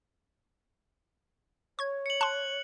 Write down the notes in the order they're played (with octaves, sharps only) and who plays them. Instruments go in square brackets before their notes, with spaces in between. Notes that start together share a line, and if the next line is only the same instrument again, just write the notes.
[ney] C#5 [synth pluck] C#6 G#6
[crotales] C#7 F#7
[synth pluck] A5 C6 [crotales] F#6